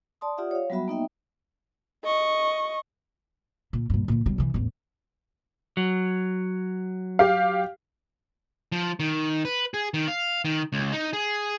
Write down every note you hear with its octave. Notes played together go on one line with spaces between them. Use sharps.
D5 A5 C6 D#6
F4 G4 D5 E5 F#5 D#6
C#5 F5
F#3 G3 B3 F#4 E5 B5
A#3 B3 D#4 D#5 E5 G5
D#5 C#6
A#2
G2 A#2
A#2 E3
E1 G3
C3 E3
A1 E2
F#3
G4 F5
F3
D#3
B4
G#4
D#3
F5
D#3
C#2
D#4
G#4